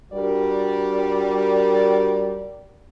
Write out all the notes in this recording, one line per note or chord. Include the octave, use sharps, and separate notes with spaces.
G3 D4 F#4 A#4 D5